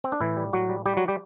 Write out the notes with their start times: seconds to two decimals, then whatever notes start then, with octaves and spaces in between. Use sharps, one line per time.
0.04 C4
0.12 D4
0.20 A2 E3 E4
0.37 G3
0.53 A2 F#3 F#4
0.69 G3
0.86 G3 G4
0.97 F#3 F#4
1.08 G3 G4